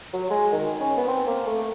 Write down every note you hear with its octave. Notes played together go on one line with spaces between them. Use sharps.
F#3
G#3
D#3
C#4
B3
C4
A#3
A3